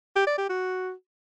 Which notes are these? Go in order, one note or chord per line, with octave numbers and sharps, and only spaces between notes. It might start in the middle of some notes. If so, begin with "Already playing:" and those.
G4
D5
G4
F#4